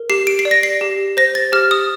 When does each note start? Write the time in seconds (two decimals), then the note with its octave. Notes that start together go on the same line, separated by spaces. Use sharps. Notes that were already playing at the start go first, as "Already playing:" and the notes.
Already playing: A#4
0.10 G4 C7
0.27 D7
0.39 C7
0.45 D5
0.51 A#6
0.63 C7
0.81 G4
1.17 C5 A#6
1.35 A6
1.52 G4 F6
1.71 D#6